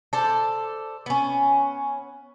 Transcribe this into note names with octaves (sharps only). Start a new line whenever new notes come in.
A4 C5 D5
B3 C#4